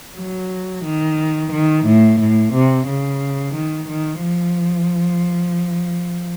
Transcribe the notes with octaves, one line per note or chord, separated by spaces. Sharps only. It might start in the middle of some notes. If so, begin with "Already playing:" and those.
F#3
D#3
D#3
A2
A2
C3
C#3
D#3
D#3
F3